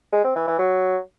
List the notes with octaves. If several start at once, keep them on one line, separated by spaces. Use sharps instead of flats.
G#3
C4
E3
E3
F#3